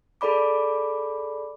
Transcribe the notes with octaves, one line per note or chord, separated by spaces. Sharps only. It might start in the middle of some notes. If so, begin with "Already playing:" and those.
G#4 A4 D5 B5 D6